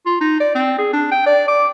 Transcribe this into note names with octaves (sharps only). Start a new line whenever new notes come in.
F4
D#4
D5
C4
G#4
D4
G5
D5
D6